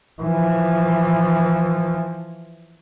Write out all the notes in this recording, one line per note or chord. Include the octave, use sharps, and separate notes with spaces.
E3 F3